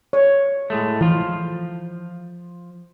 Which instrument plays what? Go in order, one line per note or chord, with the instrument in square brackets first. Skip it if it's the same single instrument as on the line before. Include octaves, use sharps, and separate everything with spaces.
[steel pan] C#5
[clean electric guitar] A2 G#3 A3
[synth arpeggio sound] E3 [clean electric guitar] F3 F4